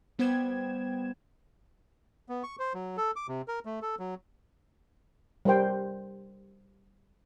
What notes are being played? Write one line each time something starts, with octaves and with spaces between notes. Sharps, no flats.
G3 B3 C5 G5 G#6 E7
B3
C#6
C5
F#3
A4
D6
C3
A#4
A3
A4
F#3
G3 A#4 C5 G5